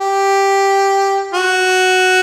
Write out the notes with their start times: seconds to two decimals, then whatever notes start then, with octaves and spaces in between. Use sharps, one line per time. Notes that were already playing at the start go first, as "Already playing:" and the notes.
0.01 G4
1.34 F#4